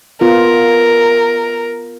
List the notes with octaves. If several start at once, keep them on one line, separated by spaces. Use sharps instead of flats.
B3 F4 A#4